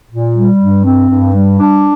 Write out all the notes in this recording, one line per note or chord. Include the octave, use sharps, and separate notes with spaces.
A#2
G3
G2
C4
G2
G3
D4